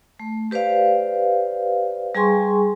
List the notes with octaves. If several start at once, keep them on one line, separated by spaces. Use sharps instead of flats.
A3
G4 B4 C5 D5 F5
G3 G#4 G#5 C6 C#6